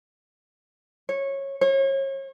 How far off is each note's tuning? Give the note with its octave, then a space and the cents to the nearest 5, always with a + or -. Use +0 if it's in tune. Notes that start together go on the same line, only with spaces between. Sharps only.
C#5 -15
C#5 -35